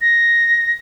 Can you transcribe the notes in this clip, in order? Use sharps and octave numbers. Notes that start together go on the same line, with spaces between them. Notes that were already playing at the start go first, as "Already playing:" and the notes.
A#6